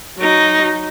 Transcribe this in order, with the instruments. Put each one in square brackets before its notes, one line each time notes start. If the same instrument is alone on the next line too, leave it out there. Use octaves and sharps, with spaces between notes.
[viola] F#3 D#4